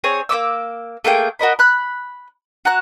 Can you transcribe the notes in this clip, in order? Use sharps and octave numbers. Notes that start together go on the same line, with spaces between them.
C4 G#4 C#5
A#3 C#4 D6 E6
A3 A#3 G#4 G5
F#4 A#4 D#5 B5
B5 F#6
F#4 A#5 F#6